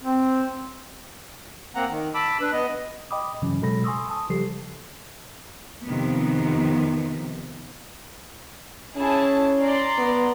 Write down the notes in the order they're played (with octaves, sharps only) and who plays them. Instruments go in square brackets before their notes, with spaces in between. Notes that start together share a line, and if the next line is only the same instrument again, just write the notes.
[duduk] C4
[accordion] A#3 C4 F#5 A#5
D#3
A5 B5 D6 E6
D4 B4
B3 D#5
[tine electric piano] D#5 G5 B5 D6 D#6
G2 C#3 E3 F#3 C#4
B2 F#3 G#3 A4 B5 A#6
G#5 C6 C#6 D#6 E6
A5 D#6
C#3 F3 G3 G4 A4 C7
[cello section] F2 C3 D#3 F3 B3
[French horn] C#4 [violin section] E4 G#4 A5
[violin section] D5 A#5 C6
[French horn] B3